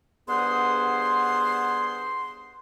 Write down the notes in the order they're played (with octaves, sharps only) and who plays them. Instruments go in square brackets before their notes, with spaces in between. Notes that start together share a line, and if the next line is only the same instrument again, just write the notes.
[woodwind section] G2 B3 G#4 C5 F#5 C6